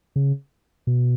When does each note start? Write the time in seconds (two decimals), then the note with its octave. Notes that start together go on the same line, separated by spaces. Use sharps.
0.16 C#3
0.87 B2